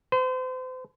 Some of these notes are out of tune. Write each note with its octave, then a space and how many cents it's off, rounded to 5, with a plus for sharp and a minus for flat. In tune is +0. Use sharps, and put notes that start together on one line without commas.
C5 -40